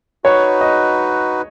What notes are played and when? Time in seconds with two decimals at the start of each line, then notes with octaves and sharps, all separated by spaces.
0.24 D#4 F#4 B4 C#5
0.61 D#5